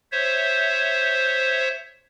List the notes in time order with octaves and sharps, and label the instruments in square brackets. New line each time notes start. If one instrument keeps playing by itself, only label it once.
[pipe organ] C5 C#5 E5